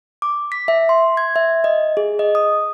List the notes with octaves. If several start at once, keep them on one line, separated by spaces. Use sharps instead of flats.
D6
B6
E5
C6
G#6
E5
D#5
G#4
D#5
D#6